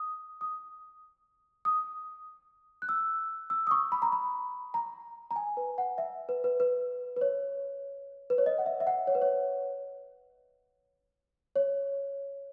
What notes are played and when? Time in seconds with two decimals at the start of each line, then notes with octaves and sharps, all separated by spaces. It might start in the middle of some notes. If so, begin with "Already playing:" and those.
Already playing: D#6
0.41 D#6
1.65 D#6
2.82 F#6
2.89 E6
3.50 E6
3.67 D#6
3.71 C#6
3.92 B5
4.02 A#5
4.12 B5
4.74 A#5
5.31 A#5
5.36 G#5
5.57 B4
5.78 F#5
5.98 E5
6.29 B4
6.44 B4
6.60 B4
7.17 B4
7.21 C#5
8.30 B4
8.38 C#5
8.46 D#5
8.58 F#5
8.66 E5
8.80 E5
8.87 F#5
9.07 C#5
9.15 B4
9.22 C#5
11.56 C#5